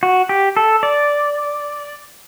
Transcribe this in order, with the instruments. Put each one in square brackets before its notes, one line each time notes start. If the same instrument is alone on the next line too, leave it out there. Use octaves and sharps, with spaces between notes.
[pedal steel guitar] F#4
G4
A4
D5